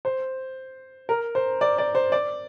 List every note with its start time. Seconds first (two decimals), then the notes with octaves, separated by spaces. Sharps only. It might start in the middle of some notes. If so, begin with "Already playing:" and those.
0.05 C5
1.09 A#4
1.35 C5
1.61 D5
1.78 D5
1.95 C5
2.12 D5